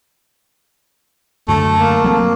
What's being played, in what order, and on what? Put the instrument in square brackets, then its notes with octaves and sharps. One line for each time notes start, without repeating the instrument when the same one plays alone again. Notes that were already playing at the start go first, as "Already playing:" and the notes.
[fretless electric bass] F#2 D3 [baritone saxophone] A3 [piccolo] A5
[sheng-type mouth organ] A#3
[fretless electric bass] F#3 C4